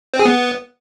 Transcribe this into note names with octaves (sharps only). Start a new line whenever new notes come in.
C4
G#4
B3